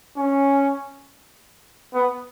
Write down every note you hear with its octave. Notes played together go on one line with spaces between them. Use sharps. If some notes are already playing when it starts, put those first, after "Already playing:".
C#4
B3